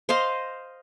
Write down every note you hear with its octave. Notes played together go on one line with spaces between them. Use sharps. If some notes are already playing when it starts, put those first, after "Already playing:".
C5 D#5 F5 C6